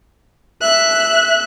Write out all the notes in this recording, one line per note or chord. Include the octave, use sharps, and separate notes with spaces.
E5 F#6